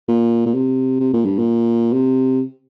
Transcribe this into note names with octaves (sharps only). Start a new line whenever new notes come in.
A#2
A#2
C3
C3
A#2
G2
A#2
C3